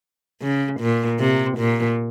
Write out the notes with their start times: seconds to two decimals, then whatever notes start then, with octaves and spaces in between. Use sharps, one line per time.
0.41 C#3
0.80 A#2
1.19 C3
1.58 A#2